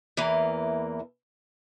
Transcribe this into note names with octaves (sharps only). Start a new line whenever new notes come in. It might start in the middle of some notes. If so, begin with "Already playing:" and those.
E2 E3 A#3